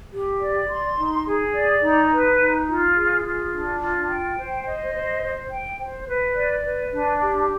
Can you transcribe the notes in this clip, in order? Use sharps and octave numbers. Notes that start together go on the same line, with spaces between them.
G4
D5
C6
D#4
G#4
D5
D#4
B4
D#4
F4
G#4
F4
D4
F4
G5
C5
D#5
C5
C5
G5
C5
B4
D5
B4
D4
G4